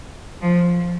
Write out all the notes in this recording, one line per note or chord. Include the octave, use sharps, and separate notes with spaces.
F3